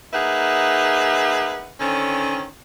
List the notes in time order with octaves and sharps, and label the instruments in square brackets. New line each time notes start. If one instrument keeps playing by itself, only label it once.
[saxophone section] A#3 D#4 G#4 B4 E5 F#5
D3 D#3 C4 C#4